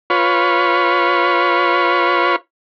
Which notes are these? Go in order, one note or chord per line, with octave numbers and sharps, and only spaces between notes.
F4 B4 C#5